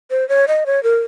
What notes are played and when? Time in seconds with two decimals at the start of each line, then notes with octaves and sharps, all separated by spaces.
0.11 C5
0.29 C#5
0.48 D#5
0.66 C#5
0.83 A#4